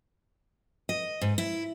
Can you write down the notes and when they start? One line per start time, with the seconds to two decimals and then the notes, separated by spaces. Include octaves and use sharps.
0.89 D#5
1.21 G#2
1.38 E4